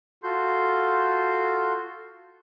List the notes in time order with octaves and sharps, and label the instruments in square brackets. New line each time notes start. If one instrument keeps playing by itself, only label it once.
[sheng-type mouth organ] F4 F#4 A4 C6 G6